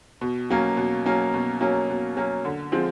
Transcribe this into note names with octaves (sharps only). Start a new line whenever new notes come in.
B2
F#3 A#3 C#4
B2
F#3 A#3 C#4
B2
F#3 A#3 C#4
B2
F#3 A#3 C#4
D3
F3 G#3 C4